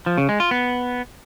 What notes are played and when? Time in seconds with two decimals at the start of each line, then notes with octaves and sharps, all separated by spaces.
0.06 F3
0.18 C#3
0.29 G#3
0.40 F4
0.51 B3